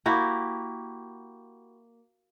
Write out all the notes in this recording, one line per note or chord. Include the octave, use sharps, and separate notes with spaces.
A#3 E4 F#4 G4